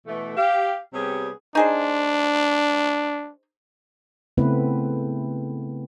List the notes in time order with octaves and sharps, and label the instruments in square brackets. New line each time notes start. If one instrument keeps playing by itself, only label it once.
[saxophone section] B2 E3 A3
G4 F5
C3 G3 B3 C#4 G#4
[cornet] D4 [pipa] D#4 G#4 C5
[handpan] C#3 A3 B3 C4 E4 B4